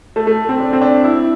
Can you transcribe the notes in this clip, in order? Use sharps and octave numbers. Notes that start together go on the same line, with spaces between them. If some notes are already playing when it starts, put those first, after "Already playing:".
A3
A3
C4
D4
C4
D4
E4